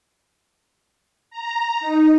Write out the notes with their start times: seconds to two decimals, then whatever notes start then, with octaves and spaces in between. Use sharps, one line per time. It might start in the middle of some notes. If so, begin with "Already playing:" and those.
1.30 A#5
1.80 D#4